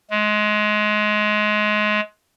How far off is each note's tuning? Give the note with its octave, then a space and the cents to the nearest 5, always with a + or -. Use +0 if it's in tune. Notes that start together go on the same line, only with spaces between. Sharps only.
G#3 +25